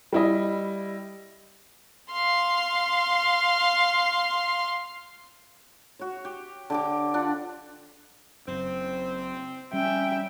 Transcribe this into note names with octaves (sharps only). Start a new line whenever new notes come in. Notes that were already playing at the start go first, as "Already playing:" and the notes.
G3 E4 D#5
F5 C6
F#4 C#5
G4
D3 G4 D6
D4 F4 F#5
F#1 F#2 C4
G3 C#4 E5 G5